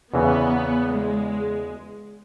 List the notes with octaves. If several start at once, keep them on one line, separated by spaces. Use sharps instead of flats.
E2 C#3 E3 B3
G#3